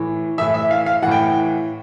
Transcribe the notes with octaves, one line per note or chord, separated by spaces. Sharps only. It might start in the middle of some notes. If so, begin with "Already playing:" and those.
Already playing: A2 E3
A2 E3 E5
E5
F5
F5
A2 E3 F#5 G5